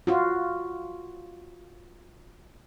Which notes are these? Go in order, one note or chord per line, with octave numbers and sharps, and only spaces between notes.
F4 F#4